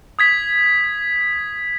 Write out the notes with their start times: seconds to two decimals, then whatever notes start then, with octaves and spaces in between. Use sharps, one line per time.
0.19 D#6 G#6 B6